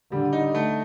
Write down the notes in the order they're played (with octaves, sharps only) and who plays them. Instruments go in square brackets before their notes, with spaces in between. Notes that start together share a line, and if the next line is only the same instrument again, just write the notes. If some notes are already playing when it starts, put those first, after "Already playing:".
[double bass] D3 [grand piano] G3
[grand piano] D#4
A3